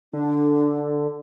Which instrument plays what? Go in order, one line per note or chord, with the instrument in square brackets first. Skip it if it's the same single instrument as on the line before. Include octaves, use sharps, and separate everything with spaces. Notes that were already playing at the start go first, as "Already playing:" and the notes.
[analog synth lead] D3 [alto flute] D4